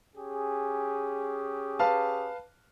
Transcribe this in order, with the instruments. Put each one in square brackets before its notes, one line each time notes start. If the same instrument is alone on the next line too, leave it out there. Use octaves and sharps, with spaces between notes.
[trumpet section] C#4 G4 G#4
[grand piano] B4 F5 A5